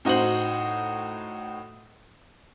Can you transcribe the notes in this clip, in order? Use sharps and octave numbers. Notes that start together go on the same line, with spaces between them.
A2 D#4 F#4 C5 F#7